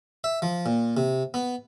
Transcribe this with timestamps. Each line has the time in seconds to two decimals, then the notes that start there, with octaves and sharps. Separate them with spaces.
0.24 E5
0.42 F3
0.66 A#2
0.97 C3
1.34 B3